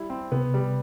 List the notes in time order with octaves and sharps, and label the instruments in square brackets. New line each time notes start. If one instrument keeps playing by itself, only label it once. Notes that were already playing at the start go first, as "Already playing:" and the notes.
Already playing: [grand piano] G3 E4
C4
[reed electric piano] C3 [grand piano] B3
[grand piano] G3